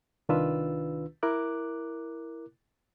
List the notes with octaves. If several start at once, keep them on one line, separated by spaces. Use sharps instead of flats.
C2 D#3 D4 F4 B4 E6
E4 A#4 D6 F#6